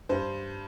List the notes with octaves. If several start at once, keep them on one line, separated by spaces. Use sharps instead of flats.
G2 C5